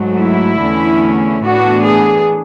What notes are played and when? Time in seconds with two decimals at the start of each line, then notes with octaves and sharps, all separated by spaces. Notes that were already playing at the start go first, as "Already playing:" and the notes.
Already playing: G#2 F#3 A3
0.20 E4
0.61 E2 D3 A3 C#4
1.44 A2 E3 B3 D4 F#4
1.85 G#4